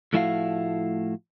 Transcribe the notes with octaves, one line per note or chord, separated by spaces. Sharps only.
A2 F3 A3 E4 F#4 F5